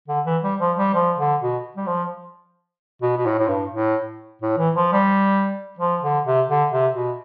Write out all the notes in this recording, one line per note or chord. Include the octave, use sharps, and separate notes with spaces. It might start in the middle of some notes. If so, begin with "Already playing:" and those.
D3
E3
G3
F3
G3
F3
D3
B2
G3
F3
B2
B2
A2
A2
G2
A2
A2
E3
F3
G3
F3
D3
C3
D3
C3
B2